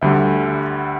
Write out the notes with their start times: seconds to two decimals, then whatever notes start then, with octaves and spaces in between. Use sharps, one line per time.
0.01 D2 D3 G3 E5